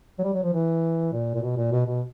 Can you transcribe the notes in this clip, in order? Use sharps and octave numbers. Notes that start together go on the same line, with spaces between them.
F#3
G3
F#3
F3
E3
A#2
A#2
B2
A#2
B2
B2